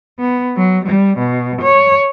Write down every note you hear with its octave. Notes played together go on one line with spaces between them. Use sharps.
B3
F#3
G3
B2
C#5